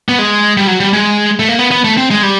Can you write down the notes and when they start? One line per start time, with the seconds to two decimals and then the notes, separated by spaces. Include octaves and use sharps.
0.09 B3
0.19 G#3
0.57 G3
0.67 F#3
0.80 G3
0.93 G#3
1.39 A3
1.49 A#3
1.59 B3
1.71 B3
1.84 A3
1.97 C4
2.11 G#3
2.23 G3